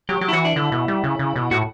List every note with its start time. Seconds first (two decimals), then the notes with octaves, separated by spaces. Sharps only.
0.09 F#3 G4
0.21 F#3 G4
0.28 E4
0.33 E3 F#4
0.45 D4
0.56 D3 E4
0.72 B2
0.88 G3
1.04 C#3
1.19 C#3
1.36 B2
1.51 A2 F#4